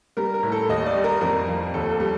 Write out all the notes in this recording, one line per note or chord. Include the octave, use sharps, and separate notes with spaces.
G3 A#4
A#4
A2
A4
D#2 D#5
D5
G3
A#4
F2 A#4
F3
D#2 A4
A4
G3